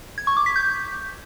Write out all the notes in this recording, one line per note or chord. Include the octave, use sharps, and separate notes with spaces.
G#6
C#6
D6
B6
G6